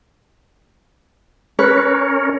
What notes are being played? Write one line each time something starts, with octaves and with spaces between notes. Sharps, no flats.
C#4 A#4 B4 C#5